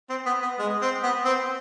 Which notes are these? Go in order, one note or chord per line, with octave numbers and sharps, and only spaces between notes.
C4
B3
B3
G#3
C4
B3
C4